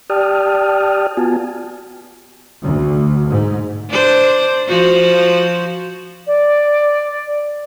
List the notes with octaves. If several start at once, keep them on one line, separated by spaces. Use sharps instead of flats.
G4 D5 G5 A5 D#6 F6
B3 F4 F#4 G#5 A5
D2
G#2
D4 C5
F3 F#4 C5
D5